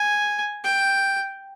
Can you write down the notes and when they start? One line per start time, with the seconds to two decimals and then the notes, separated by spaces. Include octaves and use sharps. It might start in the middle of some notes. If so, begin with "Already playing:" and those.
Already playing: G#5
0.64 G5